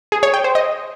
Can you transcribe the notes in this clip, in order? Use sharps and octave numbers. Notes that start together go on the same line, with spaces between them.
G#4
C#5
G5
C5
D#5